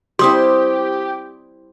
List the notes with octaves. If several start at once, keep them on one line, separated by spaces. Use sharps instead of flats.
G3 C4 E4 G4 C6 D#6